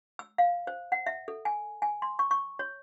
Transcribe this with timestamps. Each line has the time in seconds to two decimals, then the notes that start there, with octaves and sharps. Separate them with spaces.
0.19 E6
0.38 F5
0.67 C5
0.92 F#5
1.06 E5
1.28 A4
1.45 G#5
1.82 G#5
2.02 C6
2.19 C#6
2.31 C#6
2.59 C#5